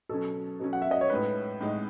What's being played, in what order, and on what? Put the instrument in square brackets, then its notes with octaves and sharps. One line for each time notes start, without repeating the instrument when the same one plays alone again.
[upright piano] B2 F#3 C#4 [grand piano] A4
[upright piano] B2 F#3 C#4
[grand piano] F#5
E5
D#5
C#5
[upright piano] A2 G#3 D#4 [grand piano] B4
[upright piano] A2 G#3 D#4